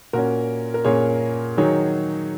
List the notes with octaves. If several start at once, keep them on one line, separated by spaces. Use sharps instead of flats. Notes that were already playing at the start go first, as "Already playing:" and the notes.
A#2 A#3 C#4 F#4 A#4
A#4
A#2 A#3 C#4 G#4 C#5
D#3 F#3 D#4 G#4 C#5